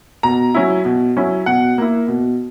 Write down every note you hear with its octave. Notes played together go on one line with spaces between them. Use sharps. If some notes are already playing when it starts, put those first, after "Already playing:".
B2 A#5
F#3 C#4 E4
B2
F#3 C#4 E4
B2 F#5
A#3 E4
B2